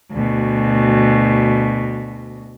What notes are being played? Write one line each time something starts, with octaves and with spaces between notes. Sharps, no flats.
D2 B2